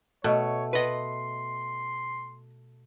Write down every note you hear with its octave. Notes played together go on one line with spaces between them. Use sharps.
B2 A3 C#5
B4 D#5 C6